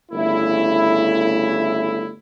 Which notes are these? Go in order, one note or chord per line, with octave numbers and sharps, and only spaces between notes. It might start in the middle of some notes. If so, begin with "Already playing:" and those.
G1 C#3 A3 E4